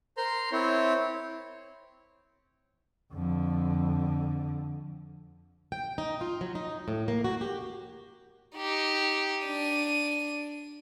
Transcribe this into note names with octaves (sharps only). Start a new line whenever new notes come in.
A#4 C5 A#5 C6
C4 E4 C#5
F2 D3
G5
D#4
F4
F#3
D#4
A2
A#3
F#4
G4
D#4 G4
D4 D#7